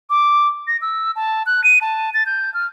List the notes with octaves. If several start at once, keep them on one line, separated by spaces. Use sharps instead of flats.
D6
A#6
E6
A5
F#6
D#7
A5
A6
G6
F6